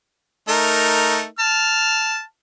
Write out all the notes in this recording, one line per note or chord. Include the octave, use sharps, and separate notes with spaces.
A3 D#4 A#4
A5 F6